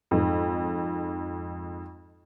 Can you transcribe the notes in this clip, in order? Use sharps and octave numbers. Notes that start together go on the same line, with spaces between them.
F2 G#2